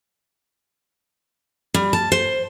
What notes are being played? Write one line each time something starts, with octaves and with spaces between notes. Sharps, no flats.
G3
A5
C5